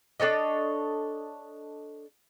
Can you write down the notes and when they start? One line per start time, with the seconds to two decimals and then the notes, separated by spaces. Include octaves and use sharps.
0.20 D4 A4 C#5 D#5